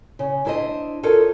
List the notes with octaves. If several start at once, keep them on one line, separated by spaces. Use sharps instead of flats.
C#3
D4 E4 A4 C5 D#5
D#4 F4 A4 A#4 C#5